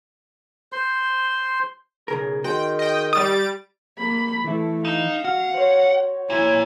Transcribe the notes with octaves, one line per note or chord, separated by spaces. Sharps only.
C5 C6
B1 C#3 G#4 A#4
D#3 F#4 G#4 C5 G5
D#5 G5
G3 D#6 A6 D7
A#3 B5
E3 A3 E4
D#4 F5 E7
F#4 F#5 F6
C5 C#5
A#2 E4 G#5